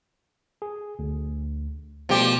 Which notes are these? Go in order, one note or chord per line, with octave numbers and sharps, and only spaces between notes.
G#4
D2
B2 F3 G3 A3 G4